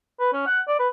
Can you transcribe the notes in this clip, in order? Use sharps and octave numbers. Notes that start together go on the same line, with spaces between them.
B4
C#4
F#5
D5
B4